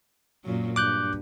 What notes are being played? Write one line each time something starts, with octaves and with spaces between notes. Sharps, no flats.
F#2 A#2 F#3
G2 D6 F#6 G6